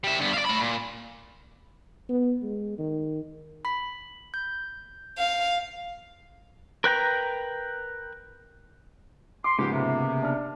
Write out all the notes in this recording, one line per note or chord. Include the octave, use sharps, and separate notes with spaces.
G3 E5
G2 B3
D5 F5
A3 B5
A#2
B3
G#3
D#3
B5 B6
G6
F5
A#4 B4 G5 A#5
C6 D6
G#2 C#3 F3 A#3 B3 G4
C3
D4 F6